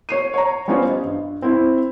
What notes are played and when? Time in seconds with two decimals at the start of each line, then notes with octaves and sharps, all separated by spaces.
0.09 C#5 C7 D#7
0.34 C#5 A#5
0.68 G3 B3 C#4 F4 C5 C#5
0.87 D#5
1.04 G2
1.42 C4 E4